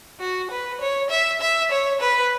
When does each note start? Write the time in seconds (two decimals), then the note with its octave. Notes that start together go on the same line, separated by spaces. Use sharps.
0.20 F#4
0.51 B4
0.81 C#5
1.10 E5
1.41 E5
1.71 C#5
2.00 B4